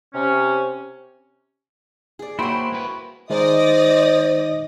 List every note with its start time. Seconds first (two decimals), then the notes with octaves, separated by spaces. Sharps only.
0.13 C3 C#4
2.19 G#4 D5
2.39 A#3 E4 F#4 C5 C#5 G5 B5 C6
2.72 A#3 B4
3.30 D#3 G#3 D#4 C5 D5 D#5 D#6 A#6